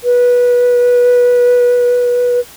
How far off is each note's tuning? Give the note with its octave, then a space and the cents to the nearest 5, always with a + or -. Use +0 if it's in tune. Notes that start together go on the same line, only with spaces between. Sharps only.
B4 -20